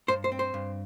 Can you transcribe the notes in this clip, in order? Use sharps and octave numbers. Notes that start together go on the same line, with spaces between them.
G2 C5
C5
C4
C5
G2